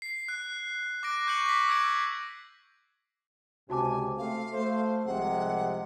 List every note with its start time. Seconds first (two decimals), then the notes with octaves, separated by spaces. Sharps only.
0.02 C7
0.28 F#6
1.03 D6 F#6 A#6 D7
1.27 C#6 G6 A#6 C#7 F#7
1.46 D6 B6
1.68 E6 G#6 D7
3.70 C#2 C3 F#4 G#5 A5 D6
4.18 A3 C4 F5
4.53 A3 C5
5.06 C2 C3 F3 G#3 F#5